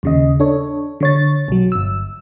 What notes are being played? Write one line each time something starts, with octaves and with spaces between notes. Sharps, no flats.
D#2 C#3 D#5
D4 A4 C#5
D3 C#5 A6
B1 F#3
G1 E6